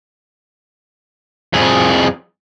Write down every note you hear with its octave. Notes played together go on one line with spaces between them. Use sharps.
F2 G#4